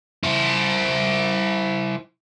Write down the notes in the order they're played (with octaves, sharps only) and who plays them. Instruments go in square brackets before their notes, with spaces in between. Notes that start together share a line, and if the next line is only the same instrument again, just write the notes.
[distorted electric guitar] E4 C5